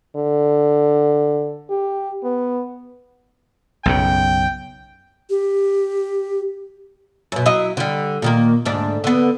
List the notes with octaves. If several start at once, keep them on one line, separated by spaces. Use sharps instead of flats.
D3
G4
B3
B1 F#2 C#3 G5
G4
F#2 B2
F#3 E4 D#5
D3 G3
A#2 D#3 A#3
D2 G#2 D4
D3 B3